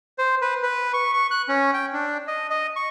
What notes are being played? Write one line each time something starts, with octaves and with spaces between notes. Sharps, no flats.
C5
B4
B4
C#6
C#6
F#6
C#4
G5
D4
D#5
D#5
C#6